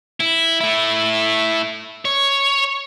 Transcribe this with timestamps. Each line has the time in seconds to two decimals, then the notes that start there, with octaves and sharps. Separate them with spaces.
0.20 E4
0.61 A3 E4
2.05 C#5